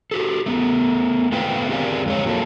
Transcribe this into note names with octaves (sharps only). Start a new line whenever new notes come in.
F#4 G4 A4
A3 B3
A3 B3 C4 F4 B4 G5
C4 G4 G#4 A#4 D5 F5
F2 G#3 C#5
F#3 A#3 F4 A4